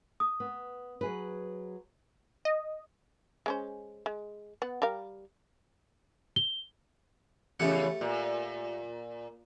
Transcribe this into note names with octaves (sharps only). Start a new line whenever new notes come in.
D#6
B3
F#3 G#4 B4
D#5
G#3 C#4 C5
G#3
B3 F#5
G3 A#4 F5
G7
E2 C#3 A3 G4 F#5
A#2